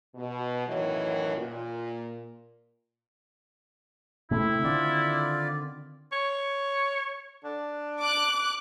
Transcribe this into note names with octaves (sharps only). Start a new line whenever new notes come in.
B2
F#2 A2 D#3 E3 F#3
A#2
C3 A3 C4 E4
D3 D#3 C4 F4 D5
C#5
D4
D6 F#6